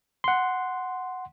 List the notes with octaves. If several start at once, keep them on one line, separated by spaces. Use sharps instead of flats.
F#5 C6